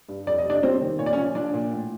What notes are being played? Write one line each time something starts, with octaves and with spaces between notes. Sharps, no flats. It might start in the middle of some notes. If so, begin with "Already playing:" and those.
G2
F2 D5
D#5
C3 D4 D5
G3 C4 C5
D#3
A#2 C#5
D5
C#4 C#5
F3
F3 D4 D5
A#2
A2